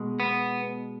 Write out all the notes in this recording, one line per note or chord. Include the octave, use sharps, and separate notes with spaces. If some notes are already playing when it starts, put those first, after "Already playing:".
Already playing: B2 G#3
B3